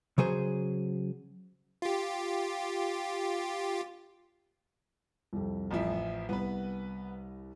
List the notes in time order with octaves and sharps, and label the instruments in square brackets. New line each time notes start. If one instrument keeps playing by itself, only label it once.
[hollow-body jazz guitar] C#3 F#3 G#4 C5
[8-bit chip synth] F4 G4
[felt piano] C2 F2
[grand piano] A1 F3 E4
[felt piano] C2 [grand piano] B3 B4